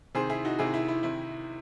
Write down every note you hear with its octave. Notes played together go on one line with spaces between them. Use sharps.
C3 D#3 G#4 C5
E4 G#4
D#4 F#4
C3 D#3 E4 G#4
E4
E4
C3 D#3 E4